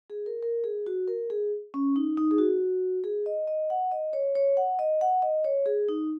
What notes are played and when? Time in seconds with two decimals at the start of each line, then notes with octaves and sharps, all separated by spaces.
0.10 G#4
0.26 A#4
0.43 A#4
0.64 G#4
0.86 F#4
1.08 A#4
1.30 G#4
1.74 C#4
1.96 D#4
2.18 D#4
2.31 G#4
2.38 F#4
3.04 G#4
3.26 D#5
3.48 D#5
3.70 F#5
3.92 D#5
4.13 C#5
4.35 C#5
4.57 F#5
4.79 D#5
5.01 F#5
5.22 D#5
5.44 C#5
5.66 G#4
5.89 D#4